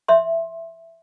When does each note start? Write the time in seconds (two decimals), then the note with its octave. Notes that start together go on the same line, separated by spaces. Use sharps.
0.08 E5 C6